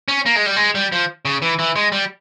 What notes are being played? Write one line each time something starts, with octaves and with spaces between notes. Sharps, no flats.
C#4
A#3
G#3
G3
G#3
G3
F3
C#3
E3
E3
G#3
G3